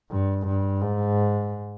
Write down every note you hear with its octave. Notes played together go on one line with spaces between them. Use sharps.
G2
G2
G#2